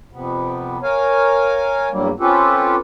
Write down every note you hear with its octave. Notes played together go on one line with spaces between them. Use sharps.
F2 C3 B3
A#4 C#5 F5 G#5
E2 G2 F#3 G3 A#3
C4 C#4 F4 G4 A4 B4